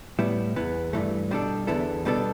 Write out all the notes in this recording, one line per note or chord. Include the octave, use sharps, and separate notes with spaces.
A2 G3 B3 E4
E2 E3 B3
G2 E3 A3
B2 G3 D4 A4
E2 D3 B3 E4 A4
B2 G3 B3 D4 A4